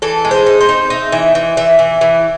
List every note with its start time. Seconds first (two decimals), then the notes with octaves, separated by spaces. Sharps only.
0.02 E3 A4
0.25 G#3
0.31 C5
0.46 D#4
0.60 C5
0.69 D#4
0.90 D#4 E5
1.12 E3 E5
1.35 E3
1.57 E3 E5
1.79 E3
2.01 E3